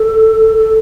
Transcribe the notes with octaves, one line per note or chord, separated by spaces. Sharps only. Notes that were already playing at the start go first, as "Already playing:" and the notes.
Already playing: A4
A4